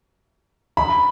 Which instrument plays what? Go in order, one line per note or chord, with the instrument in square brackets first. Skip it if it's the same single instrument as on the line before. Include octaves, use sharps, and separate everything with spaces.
[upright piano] B5